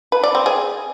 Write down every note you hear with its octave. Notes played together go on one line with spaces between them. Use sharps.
B4
D5
C4
G#4